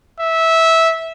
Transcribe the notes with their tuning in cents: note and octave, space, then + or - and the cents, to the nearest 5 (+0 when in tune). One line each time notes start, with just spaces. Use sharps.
E5 -15